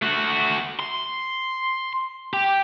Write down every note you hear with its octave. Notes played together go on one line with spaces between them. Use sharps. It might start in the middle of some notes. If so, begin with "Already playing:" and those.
A3 F#4
C6
G4